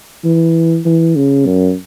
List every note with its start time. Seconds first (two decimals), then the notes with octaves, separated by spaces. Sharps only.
0.24 E3
0.85 E3
1.16 C#3
1.46 F#2